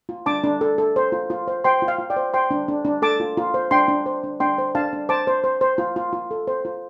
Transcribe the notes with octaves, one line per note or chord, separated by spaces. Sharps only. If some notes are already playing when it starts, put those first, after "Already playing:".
F4
D4 A5 D6
D4
A4
A4
C5
F4
F4
C5
C5 G5 C6
F4
F5
F4
D5 G5
C5
C5 G5 C6
D4
D4
D4
A4 A5 D6
F4
F4
C5
D4 G5 C6
D4
C5
D4
D4 G5 C6
C5
D4 F5 A5
D4
C5 A5 D6
C5
C5
C5
F4
F4
F4
A4
C5
F4